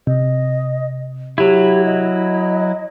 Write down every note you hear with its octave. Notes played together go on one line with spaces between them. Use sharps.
C3 D#5
F#3 E4 G4
D#5